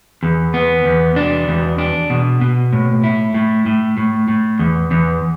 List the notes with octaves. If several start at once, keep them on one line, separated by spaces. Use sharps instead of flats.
E2
B3
E2
D4
E2
D4
B2
B2
A2
E4
A2
A2
A2
A2
E2
E2